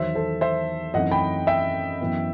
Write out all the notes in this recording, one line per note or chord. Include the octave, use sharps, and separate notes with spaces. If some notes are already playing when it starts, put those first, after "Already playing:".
Already playing: E2 D#3 F#3 C5 E5
A4 C5
C5 E5
F#2 E3 A3 C4 D#4 D#5 F#5
G5 B5
E5 G5
F#2 E3 B3